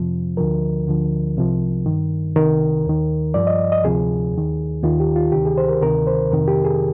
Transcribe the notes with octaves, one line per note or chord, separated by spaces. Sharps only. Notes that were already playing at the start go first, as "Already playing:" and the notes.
Already playing: F2 C3 F3
D2 D3 F3 A#4
D2 D3 F3
C2 C3 F3
G2 D#3
C2 C3 D#3 A#4
D#2 D#3
G2 F3 D5
D#5
D#5
D2 C3 F3 G#4
D#2 D#3
D#2 D#3 F4
G4
F4
D2 C3 D#3 G4
G#4
C5
A#4
D2 C3 D#3 A#4
C5
F2 C3 D#3 A#4
G4
G#4